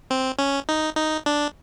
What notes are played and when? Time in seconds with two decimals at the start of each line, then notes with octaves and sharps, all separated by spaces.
0.10 C4
0.39 C#4
0.69 D#4
0.97 D#4
1.26 D4